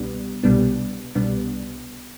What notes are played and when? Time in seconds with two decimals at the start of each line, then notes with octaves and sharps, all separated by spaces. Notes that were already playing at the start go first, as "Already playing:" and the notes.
Already playing: C2 B2 G3 B3 D4
0.43 C2 B2 G3 B3 D4
1.15 C2 B2 G3 B3 D4